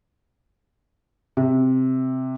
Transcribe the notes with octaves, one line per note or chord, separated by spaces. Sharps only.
C3